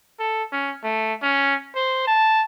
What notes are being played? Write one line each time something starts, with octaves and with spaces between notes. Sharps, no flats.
A4
C#4
A3
C#4
C5
A5